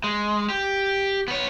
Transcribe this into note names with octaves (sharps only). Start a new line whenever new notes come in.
G#3
G4
B3 C#5